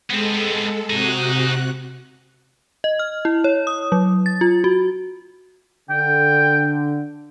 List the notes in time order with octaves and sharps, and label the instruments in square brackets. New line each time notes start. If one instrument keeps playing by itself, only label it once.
[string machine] G#3 A4 [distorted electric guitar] B3 C4
[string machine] C3 F#4 F#6 [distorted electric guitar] D#4 G#4
[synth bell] D#5
F6
E4
C#5
D#6
F#3
A6
F4
F#4
[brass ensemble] D3 [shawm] G5